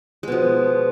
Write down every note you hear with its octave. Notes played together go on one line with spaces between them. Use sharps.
B2 F3 G#3